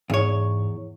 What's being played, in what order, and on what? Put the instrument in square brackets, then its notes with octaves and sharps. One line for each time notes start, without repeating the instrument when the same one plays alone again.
[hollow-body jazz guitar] E2 C#5 [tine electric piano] G#2